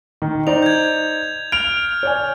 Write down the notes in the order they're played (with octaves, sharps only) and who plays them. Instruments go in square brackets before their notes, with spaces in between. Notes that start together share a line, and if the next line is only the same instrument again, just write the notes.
[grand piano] D#3
[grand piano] D#4 C5 D5 [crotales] F7
[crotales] G6 G#6
[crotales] F6 [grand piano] D7 F7
[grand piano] C#5 D5 G#5